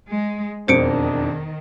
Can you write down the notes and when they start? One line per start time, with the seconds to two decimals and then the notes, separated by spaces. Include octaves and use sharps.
0.11 G#3
0.68 E1 F2 D#3 D4 C5 C#7 D7